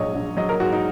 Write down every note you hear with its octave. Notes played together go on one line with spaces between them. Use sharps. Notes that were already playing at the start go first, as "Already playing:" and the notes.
Already playing: A#1 G#2 F#3 C#5 D#5
A#1
F#3 D#5
A#4
G#2 F#4
D#4